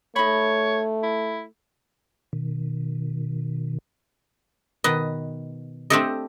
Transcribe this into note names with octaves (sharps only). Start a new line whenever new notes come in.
A3 D#4 C#5 B5
E4
B2 D#3
B2 D#3 B4 D#5
A3 C4 D4 G4 A4 D#5